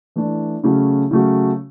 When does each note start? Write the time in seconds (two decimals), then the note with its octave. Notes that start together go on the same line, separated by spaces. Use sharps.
0.16 E3 A3 D4
0.64 C#3 F#3 A3 C#4 F#4
1.11 C#3 F#3 A3 C#4 F#4